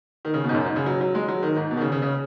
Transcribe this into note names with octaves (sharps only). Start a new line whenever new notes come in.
D#3
C#3
B2
G#2
F#2
G#2
C#3
F#3
F#3
G#3
F#3
D#3
G#2
B2
D#3
C#3
C#3
C#3